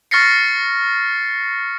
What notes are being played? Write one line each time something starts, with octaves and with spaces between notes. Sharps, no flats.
C#6 F6 A6 A#6 C7 C#7